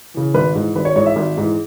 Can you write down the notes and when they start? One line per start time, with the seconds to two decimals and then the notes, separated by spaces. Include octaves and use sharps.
0.14 C#3 E3
0.34 G#1 B4
0.55 G#2 E3
0.75 G#1 B4
0.85 C#5
0.96 G#2 E3 C#5
1.06 E5
1.16 G#1
1.37 G#2 E3